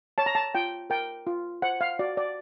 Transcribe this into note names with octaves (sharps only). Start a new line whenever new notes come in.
C#5 A5
A#5
A5
F4 G5
A#4 G5
F4
C5 F#5
F5
F#4 D5
D5